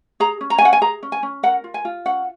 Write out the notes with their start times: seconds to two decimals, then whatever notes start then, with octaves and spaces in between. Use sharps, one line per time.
0.20 G#4 A#5
0.41 C#4
0.50 A#5
0.58 G#5
0.61 C#4 F#5
0.73 G#5
0.81 G#4 A#5
1.03 C#4
1.12 G#5
1.23 C#4
1.43 A#4 F#5
1.64 F4
1.74 G#5
1.85 F4
2.05 C#4 F#5